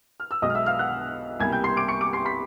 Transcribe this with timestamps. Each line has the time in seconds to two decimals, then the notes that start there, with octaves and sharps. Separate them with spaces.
0.20 F6
0.31 E6
0.42 B1 B2 G#3 D#5 D#6
0.50 F6
0.55 E5 E6
0.66 F5 F6
0.79 F#5 F#6
1.40 C2 B2 G3 A#3 G#5 G#6
1.52 G5 G6
1.64 C6 C7
1.76 D6 D7
1.88 C#6 C#7
2.01 D6 D7
2.13 C6 C7
2.25 B5 B6